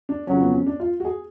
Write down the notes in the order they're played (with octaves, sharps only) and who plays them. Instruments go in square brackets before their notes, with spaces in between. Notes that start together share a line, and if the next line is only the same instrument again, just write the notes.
[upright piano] D4
[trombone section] F2 C#3 F#3 [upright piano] C#4
[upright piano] B3
C#4
D4
F4
F#4
G#4